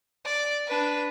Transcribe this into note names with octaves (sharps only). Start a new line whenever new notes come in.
D5
D4 B4